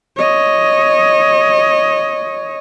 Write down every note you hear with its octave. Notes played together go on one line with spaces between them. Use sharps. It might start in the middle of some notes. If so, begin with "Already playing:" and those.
C#5 D#5